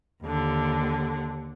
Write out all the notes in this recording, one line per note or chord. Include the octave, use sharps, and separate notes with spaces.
D#2 D3